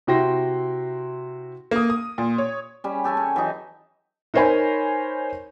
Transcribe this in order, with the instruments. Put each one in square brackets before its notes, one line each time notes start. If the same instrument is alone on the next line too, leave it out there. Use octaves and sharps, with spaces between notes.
[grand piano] C3 E4 F#4 G5 C6 A#6
[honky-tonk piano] A#3 D#6
D#6
A#2
C#5
[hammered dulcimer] G3 C#4
G4 A4 G#5 C#6
C#4
E3 F#3 D#4
[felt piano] D#4 A#4 C5 C#5 G#5 B5